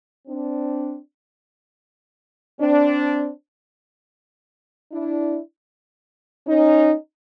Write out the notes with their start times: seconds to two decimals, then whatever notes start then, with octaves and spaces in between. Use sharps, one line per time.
0.27 C4 D4
2.59 C4 D4
4.91 D4 E4
6.46 C#4 D#4